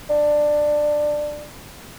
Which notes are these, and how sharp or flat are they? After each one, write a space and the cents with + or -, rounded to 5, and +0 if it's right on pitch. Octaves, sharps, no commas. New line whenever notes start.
D4 +15